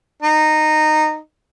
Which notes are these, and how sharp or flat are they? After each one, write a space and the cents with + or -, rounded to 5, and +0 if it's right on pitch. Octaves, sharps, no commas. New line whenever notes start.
D#4 -15